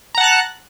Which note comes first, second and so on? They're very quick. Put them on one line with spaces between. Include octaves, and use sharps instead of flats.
A#5 F#5 A5 F#6